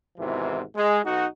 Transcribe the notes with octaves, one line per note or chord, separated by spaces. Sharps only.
G#1 E2 G#2 C3 E3
G#3
B1 D#4 F#4